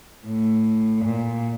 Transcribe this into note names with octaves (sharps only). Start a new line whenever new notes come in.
A2
A#2